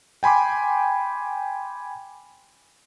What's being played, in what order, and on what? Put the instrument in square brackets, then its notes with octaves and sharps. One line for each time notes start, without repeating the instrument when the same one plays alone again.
[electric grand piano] G5 G#5 B5 C6 D6